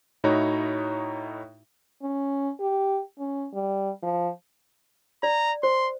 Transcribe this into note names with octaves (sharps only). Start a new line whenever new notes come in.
A2 D#4 E4 F#4 C#5 A#5
C#4
G4
C#4
G3
F3
D5 A#5
C5 C6